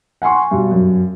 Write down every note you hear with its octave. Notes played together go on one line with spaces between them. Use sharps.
F#5 G#5 C6 C#6
G2 B2
F#2